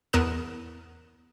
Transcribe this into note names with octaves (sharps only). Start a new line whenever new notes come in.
E2 B3 A#4 D#6 F#6 E7